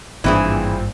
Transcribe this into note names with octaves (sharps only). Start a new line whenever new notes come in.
G#1 G2 A#2 E3 C4 D4 E4 G#4